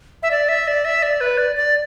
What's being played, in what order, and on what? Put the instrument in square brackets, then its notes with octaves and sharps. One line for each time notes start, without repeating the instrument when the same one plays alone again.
[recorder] E5
D5
E5
D5
E5
D5
B4
D5
D5